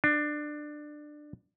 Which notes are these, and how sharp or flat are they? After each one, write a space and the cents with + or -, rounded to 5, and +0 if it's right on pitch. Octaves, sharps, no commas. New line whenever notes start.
D4 +20